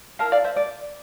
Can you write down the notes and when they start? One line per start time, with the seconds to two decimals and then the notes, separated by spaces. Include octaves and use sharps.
0.19 E4 A#4 F5 A5
0.32 D5 F5
0.44 C5 E5
0.56 D5